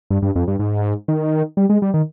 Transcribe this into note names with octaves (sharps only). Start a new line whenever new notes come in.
G2
G2
F2
G2
G#2
D#3
G3
G#3
G3
D#3